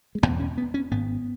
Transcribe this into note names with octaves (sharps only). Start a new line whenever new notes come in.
G#3
E1 E2 B2 B3
C#4
B3
C#4
G#1 G#2 B3